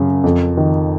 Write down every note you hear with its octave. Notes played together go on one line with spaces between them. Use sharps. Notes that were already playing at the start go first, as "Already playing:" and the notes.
Already playing: F#2 C#3
F2
D#3